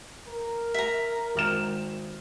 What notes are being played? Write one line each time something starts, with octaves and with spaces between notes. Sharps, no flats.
A#4
E5 A#5
G#1 F6 E7